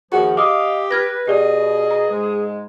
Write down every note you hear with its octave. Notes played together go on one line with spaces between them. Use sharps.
D#2 F3 F#4 G#4
G4 D#5 F5 D6 D#6
B4 F6 G#6 A#6
B2 G4 G#4 D5 D#5
A#5
G#2 G#3